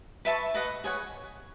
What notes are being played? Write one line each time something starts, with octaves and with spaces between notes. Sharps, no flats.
B4 E5 A5 C#6
B4 D#5 F#5
G#4 C#5 F#5